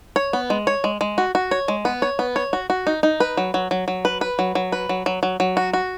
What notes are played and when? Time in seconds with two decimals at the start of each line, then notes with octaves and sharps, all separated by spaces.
0.16 C#5
0.33 B3
0.50 G#3
0.67 C#5
0.84 G#3
1.01 G#3
1.18 F#4
1.35 F#4
1.51 C#5
1.68 G#3
1.85 B3
2.02 C#5
2.19 B3
2.36 C#5
2.53 F#4
2.70 F#4
2.87 D#4
3.03 D#4
3.20 B4
3.37 F#3
3.54 F#3
3.71 F#3
3.88 F#3
4.05 B4
4.21 B4
4.39 F#3
4.55 F#3
4.72 B4
4.89 F#3
5.06 F#3
5.23 F#3
5.40 F#3
5.57 F#4
5.73 F#4